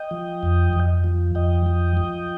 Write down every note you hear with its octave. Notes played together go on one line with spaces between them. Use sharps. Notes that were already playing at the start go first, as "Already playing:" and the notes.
Already playing: D#5 G5
F3
F2
F2
F3
F2 D#5 G5
F3
F3